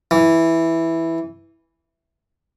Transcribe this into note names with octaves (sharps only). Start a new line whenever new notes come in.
E3